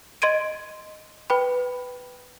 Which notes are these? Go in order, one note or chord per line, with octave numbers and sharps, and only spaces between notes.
D#5 C6 G#6 D7 D#7
B4 G5 B5